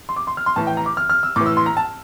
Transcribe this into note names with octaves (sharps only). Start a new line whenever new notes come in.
C6
D6
C6
F6
C6
A2 E3 A5
G5
A#5
D6
F6
F6
E6
A2 E3 D6
E6
C6
A#5
A5